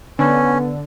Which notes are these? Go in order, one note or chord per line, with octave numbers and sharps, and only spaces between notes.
D3 B3 C#4